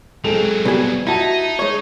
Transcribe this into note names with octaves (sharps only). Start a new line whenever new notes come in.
F#3 G#3 C4 A4 F7
B2 G3 G#5
D#4 E4 F#4 E5 A5
G#3 C#5